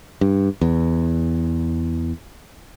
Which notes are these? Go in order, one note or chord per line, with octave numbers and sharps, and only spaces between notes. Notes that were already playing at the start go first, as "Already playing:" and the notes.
G2
E2